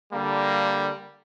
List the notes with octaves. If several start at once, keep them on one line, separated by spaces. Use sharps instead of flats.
D3 G3 A#3